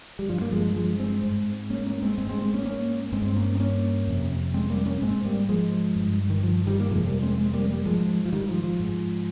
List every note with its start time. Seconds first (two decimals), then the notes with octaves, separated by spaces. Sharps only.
0.19 G3
0.28 G2 F3
0.42 A#3
0.52 F3 G#3
0.76 F3 G#3
0.99 G#3 C4
1.23 G#2
1.70 A#3 C#4
1.86 A#3 C#4
2.02 G#3 C4
2.18 G#2 G#3 C4
2.29 G#3 C4
2.41 G#3 C4
2.54 A#3 C#4
2.65 A#3 C#4
3.12 G2 G#3 C4
3.26 C4
3.36 A#3 C#4
3.55 C4
3.60 A#3 C#4
4.07 F2 C3
4.54 G#3 C4
4.70 G3 A#3
4.86 A#3 C#4
5.02 G#2 G#3 C4
5.25 G3 A#3
5.49 F3 G#3
5.96 G2
6.30 D#3
6.43 F3
6.67 D#3 G3
6.80 A#3
6.91 F2 C3 F3 G#3
7.06 G3 A#3
7.22 G#3 C4
7.31 A#3
7.38 G#3 C4
7.54 G3 A#3
7.69 G3 A#3
7.85 G#2 F3 G#3
8.25 F3
8.33 D#3 G3
8.49 F3
8.64 F3
8.80 G#2